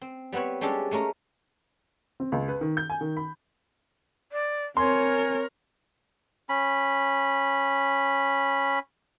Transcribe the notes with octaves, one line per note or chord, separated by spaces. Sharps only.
C4
G3 B3 C4 B4 C#5
G3 G#3 C#4 D4 G4 A4
G#3 A3 C#4 A#4
C4
C#2
B4
D#3
G6
G#5
D#3
B5
D5
C4 A#4 C#5 G#5 C6
C#4 B5